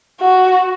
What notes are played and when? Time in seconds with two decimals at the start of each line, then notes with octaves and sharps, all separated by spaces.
0.20 F#4